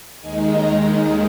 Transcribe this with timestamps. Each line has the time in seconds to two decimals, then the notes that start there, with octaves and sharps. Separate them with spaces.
0.20 D#2 D#3 G#3 D#4 G#5
0.52 A#5